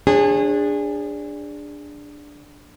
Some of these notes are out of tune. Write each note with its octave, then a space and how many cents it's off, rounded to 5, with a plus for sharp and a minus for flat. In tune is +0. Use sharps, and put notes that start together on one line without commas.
D4 +0 G#4 -25 C#5 -45